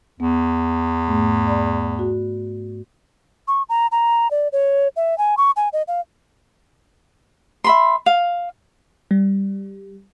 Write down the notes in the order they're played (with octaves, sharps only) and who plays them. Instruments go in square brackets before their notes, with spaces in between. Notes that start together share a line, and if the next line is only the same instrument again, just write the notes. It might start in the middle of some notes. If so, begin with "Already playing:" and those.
[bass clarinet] E2 [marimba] B3
[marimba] G#2 A3
D5 B5
F#4
[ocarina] C#6
A#5
A#5
D5
C#5
E5
G#5
C#6
G#5
D#5
F5
[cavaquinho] E5 B5 C6
F5
[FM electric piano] G3